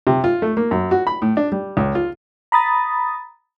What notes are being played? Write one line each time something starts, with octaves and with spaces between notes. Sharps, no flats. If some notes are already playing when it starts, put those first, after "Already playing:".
C3
F4
A3
A#3
F#2
F#4
B5
A2
D4
G3
C#2
F4
A#5 B5 D#6 A6